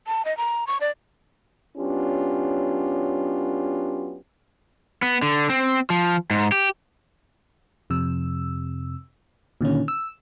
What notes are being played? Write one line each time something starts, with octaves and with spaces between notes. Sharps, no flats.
A5
D#5
A#5
C#6
D5
F#3 B3 C#4 D4 F4 G4
B3
D3
C4
F3
G#2
G4
F2 C3 E6
A#2 D3 D#3 C#4
E6